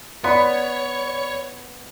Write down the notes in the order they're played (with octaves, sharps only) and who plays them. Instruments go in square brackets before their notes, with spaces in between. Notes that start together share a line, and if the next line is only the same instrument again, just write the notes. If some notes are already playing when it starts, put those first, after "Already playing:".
[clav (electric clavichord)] B3 [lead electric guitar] C#5 [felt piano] D5 B5